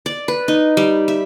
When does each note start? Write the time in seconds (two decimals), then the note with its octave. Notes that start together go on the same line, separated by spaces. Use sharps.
0.06 D5
0.28 B4
0.48 D#4
0.77 G3
1.08 E5